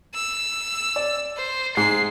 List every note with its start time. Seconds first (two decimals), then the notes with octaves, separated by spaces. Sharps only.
0.14 E6
0.96 D5
1.37 C5
1.77 G#2 C7